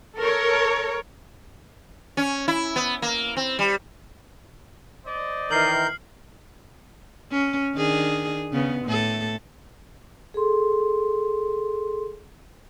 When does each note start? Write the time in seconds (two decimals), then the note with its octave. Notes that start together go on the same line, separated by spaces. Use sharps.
0.17 A4 A#4 C#5
2.17 C#4
2.48 E4
2.76 B3
3.02 A#3
3.37 C4
3.59 G3
5.05 C5 D5 D#5
5.51 D#3 E3 A#4 F6 G6 C7 F#7
7.32 C#4
7.75 D#3 D4 G#4
8.52 C#3 B3
8.85 A2 A4
10.34 G#4 A4 C6